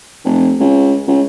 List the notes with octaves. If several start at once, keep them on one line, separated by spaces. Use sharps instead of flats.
F1
C#2
C#2